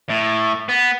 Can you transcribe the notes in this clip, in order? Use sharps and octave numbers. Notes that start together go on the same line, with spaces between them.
A2
B3